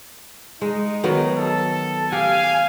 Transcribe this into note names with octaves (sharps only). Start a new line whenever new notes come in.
G#3 D#4
D#3 F#3 B3
A4
G4 F5 G#5